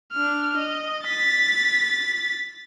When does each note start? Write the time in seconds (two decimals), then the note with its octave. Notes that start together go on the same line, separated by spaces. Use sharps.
0.12 D4 F6
0.57 D#5
1.06 A6 B6